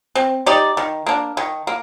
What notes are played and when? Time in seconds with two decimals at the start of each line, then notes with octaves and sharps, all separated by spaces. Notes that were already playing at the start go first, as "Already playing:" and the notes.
0.15 C4
0.46 D#4 G4 D5
0.77 D#3
1.06 A#3 D4
1.37 D#3
1.67 A#3